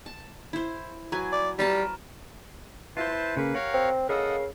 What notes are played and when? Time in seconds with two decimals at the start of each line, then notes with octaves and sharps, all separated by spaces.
0.06 A5
0.53 E4 C5
1.12 F#3 B4 G#5
1.33 D5
1.59 G3 A#4 B4 A5
2.97 E4 F4 B4 C5 A5
3.10 C5
3.37 C#3 A#3 B4
3.55 G4 A#4 C#5 F5 F#5
3.74 C4
4.09 C#3 A4 A#4 D#5 F5 F#5 E6